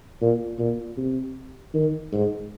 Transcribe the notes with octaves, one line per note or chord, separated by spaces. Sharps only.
A#2
A#2
C3
D#3
G#2